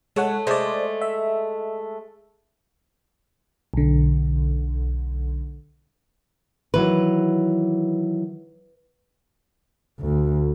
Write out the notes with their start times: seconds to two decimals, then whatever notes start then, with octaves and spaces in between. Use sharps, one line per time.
0.16 G#3 A3 C#5 F#5
0.47 G#3 A3 C5 D5
1.01 E5
3.74 B1 D3
6.74 D#3 E3 F#3 B4
10.00 D2